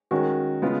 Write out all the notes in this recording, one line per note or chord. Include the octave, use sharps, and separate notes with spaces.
D#3 G#3 C#4 F#4 A#4
C#3 G#3 B3 F4